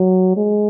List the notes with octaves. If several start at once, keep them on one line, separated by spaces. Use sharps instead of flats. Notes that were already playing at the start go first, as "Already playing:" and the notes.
Already playing: F#3
G#3